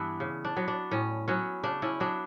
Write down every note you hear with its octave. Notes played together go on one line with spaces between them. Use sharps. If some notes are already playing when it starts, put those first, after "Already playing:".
Already playing: G2 E3 B3 D4 E4
C#3
D4
F#3 B3
D4
A2 C#4
F#3 B3 C#4
C#3 D4
C#4 E4
F#3 B3 D4